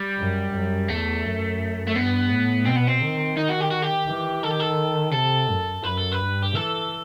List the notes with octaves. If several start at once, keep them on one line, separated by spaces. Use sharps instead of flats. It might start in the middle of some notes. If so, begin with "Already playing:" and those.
Already playing: G3
F#2
F#2
E2 A3
F#2
A3
G2 B3
A2
B2 C4
B3
C4
D#3
D#4
F#4
G4
F#4
G4
E3
D#3 A4
G4
A4
C3 A4
F#2
F#2 B4
A4
B4
G2
G4
E3 A4